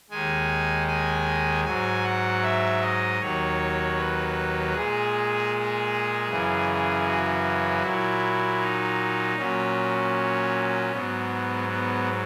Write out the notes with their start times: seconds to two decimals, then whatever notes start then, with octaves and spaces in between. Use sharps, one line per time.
0.10 D#2 D#3 G#3 G#5
0.88 G#5
1.64 G#2 F#3 G#5
2.03 F#5
2.43 E5
2.81 D#5
3.19 D#2 D#3 F#3 C#5
3.97 B4
4.73 A#2 G#3 G#4
6.28 F#2 C#3 E3
7.06 F#4
7.82 A#2 F#3 E4
8.60 D#4
9.37 A#2 F#3 C#4
10.91 G#2 B3
10.96 F#3
11.69 B3